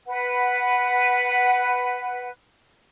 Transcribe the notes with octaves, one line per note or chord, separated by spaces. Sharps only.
B4 F#5